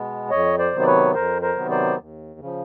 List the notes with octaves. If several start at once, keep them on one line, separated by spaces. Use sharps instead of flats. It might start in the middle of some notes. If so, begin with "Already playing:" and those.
Already playing: B2 G#3 B3
F2 C#5 D#5
C5 D5
C3 D#3 F#3 B3
D5
B4 C#5
F2 A#4 C5
A#4 C5
C3 D#3 F#3 B3
C5 D5
D#2
C#3 F3